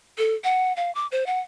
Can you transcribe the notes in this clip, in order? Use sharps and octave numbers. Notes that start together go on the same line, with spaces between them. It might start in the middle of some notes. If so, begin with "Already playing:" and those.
A4
F#5
F5
D6
C5
F#5